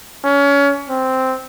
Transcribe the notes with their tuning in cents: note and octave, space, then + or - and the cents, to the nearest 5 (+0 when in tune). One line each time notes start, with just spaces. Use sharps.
C#4 +25
C4 -5